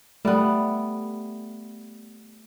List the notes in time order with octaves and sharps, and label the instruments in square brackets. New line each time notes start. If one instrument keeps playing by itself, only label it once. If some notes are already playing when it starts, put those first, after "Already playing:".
[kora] G3 B3 [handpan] A3